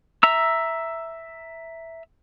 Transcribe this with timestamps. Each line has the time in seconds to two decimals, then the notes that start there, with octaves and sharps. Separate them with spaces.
0.23 E5 A#5 E6